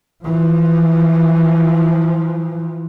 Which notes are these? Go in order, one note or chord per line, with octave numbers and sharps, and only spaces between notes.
E3 F3